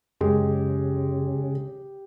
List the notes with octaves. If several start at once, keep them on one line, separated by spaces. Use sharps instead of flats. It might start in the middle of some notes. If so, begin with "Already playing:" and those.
F#2 C#3 G#3 G4